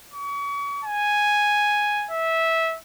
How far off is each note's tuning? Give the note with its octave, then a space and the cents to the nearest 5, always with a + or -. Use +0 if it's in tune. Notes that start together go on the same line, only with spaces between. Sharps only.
C#6 +40
G#5 +0
E5 -15